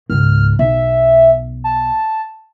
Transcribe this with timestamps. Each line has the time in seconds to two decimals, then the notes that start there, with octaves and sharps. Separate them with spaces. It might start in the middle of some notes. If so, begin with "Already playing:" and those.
0.10 C#2 G#2 F6
0.59 B1 E5
1.64 A5